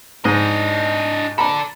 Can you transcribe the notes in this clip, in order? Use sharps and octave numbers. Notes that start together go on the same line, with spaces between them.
G#2 D4 D#5
A4 D5 A#5 B5